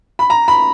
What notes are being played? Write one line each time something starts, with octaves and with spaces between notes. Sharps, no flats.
B5
A#5
B5